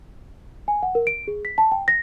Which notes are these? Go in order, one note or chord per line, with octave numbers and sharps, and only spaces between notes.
G#5
F#5
A#4
D7
G#4
B6
A5
G5
A#6